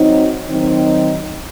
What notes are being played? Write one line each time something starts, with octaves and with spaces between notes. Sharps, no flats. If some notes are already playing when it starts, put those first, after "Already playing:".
Already playing: F#3 C4 D#4
D#3 F#3 C4 D#4